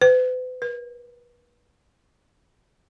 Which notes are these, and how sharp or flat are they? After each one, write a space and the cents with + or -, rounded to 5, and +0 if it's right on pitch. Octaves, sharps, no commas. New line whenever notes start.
B4 +45
B4 -40